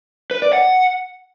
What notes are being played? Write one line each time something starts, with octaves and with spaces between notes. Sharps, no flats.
B4
D5
F#5